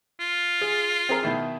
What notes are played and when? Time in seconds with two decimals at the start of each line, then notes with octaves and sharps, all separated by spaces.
0.20 F4
0.61 G#4
1.09 C4 G#4 A#4
1.23 B2 D#3 E4